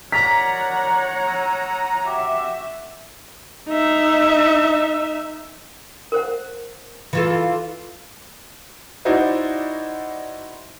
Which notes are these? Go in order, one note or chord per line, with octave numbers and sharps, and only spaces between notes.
F#4 A#4 C#5 D5 F#5 A#5 B6
D#6 E6
F#4 G4 E5
D#4 E5
A#4 C5 F#5
E3 F4 A4
D#4 E4 F#4 C5 D5